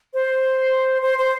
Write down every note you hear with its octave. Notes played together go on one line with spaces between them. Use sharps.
C5
C5
C5